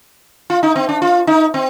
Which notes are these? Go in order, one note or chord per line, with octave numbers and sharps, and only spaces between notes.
F4
D#4
C4
D4
F4
D#4
C4